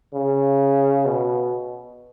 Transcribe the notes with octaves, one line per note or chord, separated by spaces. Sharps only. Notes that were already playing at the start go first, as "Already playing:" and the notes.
C#3
B2